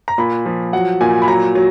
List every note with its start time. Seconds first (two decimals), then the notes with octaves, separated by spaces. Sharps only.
0.08 A#5
0.18 A#2 B5
0.46 F3
0.73 F#3 F#5
1.01 A#2 G#5
1.22 B5
1.28 F#3 A#5
1.55 F#3